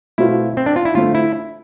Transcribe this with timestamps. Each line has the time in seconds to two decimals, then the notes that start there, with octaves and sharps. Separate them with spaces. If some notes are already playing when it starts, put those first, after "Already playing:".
0.18 B2 A3 C4 E4 F4
0.57 C4
0.66 D4
0.76 F4
0.85 E4
0.95 D3 A3 C4 F4
1.15 E4